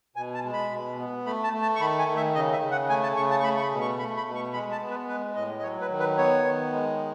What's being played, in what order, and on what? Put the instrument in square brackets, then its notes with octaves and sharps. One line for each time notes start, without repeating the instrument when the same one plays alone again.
[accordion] B2 G#5
A5
G#3
B5
B2
B3
A3 B5
A5
A3
A5
C#6
D#3 B5
G#5
D#3
E5
C#3 D#5
E5
C#3
F#5
A3 G#5
A5
C#3 C#6
A5
C#6
A3 B5
C#6
B5
B2
C#6
A3 B5
B5
B2
C#6
G#3 B5
A5
B3
B4
G#3 B4
A2 D#5
D#5
F#3 C#5
B4
D#3
B4
B3 C#5
D#3
G#3